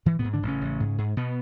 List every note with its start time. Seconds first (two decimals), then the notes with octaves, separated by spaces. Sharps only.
0.06 G#2 E3
0.19 B2 B3
0.24 G#2
0.33 D3 D4
0.43 A1 C#3 C#4
0.61 A1
0.80 G#2
0.98 G#2
1.17 B2 B3